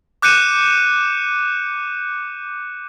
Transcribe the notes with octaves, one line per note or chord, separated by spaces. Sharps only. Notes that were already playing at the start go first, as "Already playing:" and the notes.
D6 F#6 G6 C#7 D#7 E7